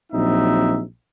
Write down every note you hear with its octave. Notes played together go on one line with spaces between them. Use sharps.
A#1 F#3 C4 D#4 E5